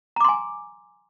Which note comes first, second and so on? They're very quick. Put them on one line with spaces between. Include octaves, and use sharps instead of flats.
A#5 D6 C6 G#5